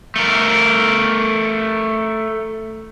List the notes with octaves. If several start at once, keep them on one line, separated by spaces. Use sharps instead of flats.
A3 A#4